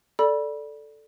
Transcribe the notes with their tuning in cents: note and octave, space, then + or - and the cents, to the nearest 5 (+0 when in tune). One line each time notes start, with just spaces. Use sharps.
A4 +0 D5 +0 B5 -25